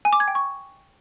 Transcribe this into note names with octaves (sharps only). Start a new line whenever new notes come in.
G#5
D6
G#6
G5
C#6